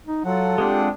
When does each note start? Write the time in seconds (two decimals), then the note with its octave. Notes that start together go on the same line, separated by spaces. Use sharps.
0.07 D#4
0.25 F#3 F4 A4 F#5
0.58 G#3 C4 D4 G4